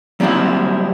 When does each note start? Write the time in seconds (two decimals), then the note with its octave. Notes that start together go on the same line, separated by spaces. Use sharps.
0.20 F#3 G3 A#3 C4 E4 F#4